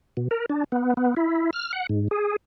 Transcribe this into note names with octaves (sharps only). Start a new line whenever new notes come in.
B2
A#4
D4
B3
B3
E4
F6
F#5
G#2
G#4